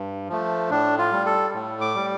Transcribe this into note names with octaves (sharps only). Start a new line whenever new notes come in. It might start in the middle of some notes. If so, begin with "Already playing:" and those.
Already playing: G2
F3 A3
A2 D4
F4
G3
A4
A2
D6
G3